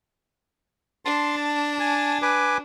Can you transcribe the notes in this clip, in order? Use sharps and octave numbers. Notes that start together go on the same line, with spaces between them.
D4 A5 C6
A5
G#5 A5
B4 G#5 D6